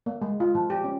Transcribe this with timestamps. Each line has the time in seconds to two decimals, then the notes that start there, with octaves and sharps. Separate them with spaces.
0.06 A#3
0.22 G#3
0.40 F4
0.55 F3
0.70 G4
0.84 C#4